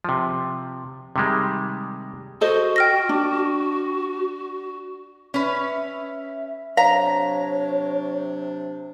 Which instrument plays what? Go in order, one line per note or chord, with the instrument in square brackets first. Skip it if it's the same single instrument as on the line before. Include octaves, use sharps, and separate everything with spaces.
[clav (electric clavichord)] C3 F3
C3 D#3 G3 G#3
[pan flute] F#4 [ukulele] A4 C5 D#5
[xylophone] G5 F6 A#6
[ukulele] D4
[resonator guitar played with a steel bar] C#4 B4 [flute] E5
[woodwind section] C3 F#3 D4 [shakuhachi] C#5 [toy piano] F5 [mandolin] A#5